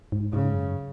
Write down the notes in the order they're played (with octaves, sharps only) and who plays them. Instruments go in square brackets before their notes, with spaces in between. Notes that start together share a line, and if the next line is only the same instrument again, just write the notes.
[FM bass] G#2
[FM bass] G#2 [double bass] C#3
[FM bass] F#2